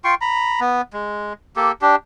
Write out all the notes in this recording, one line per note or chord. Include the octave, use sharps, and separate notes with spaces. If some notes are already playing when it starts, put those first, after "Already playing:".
F4 G5 C6 C#6
A#5 B5
B3
G#3
A#3 G4 A4
D4 G4